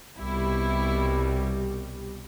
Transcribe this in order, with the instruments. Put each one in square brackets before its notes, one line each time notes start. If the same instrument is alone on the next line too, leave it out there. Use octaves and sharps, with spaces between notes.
[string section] C2 B2 G3 E4